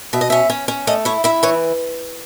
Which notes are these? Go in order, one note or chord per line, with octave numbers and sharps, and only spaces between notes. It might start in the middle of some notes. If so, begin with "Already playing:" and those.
B2 E5
D#5
C#4 E5
C#4
C#4
A3 D#5
E4 C#5
E4 E5
E3 C#5